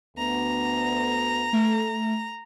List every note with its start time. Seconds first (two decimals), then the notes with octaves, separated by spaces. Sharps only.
0.17 D2 B3 A#5
1.53 A3